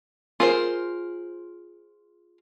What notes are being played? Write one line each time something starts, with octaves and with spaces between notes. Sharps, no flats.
F4 G#4 A#4 C5